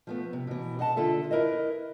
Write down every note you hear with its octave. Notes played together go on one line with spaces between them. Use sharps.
F3 A3 B3
C3
B2 E3
G#4 D#5 F#5 A5
D3 F4 A4 E5
E4 A#4 B4 D#5